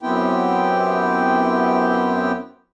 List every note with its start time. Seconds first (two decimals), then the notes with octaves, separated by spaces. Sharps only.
0.02 F#2 B3 C4 E4 G4 G5